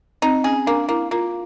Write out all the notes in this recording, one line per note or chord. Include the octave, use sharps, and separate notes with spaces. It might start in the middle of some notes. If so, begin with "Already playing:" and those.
C4 D#4
C#4 G#4
A#3 D4
A#3 E4
A#3 F4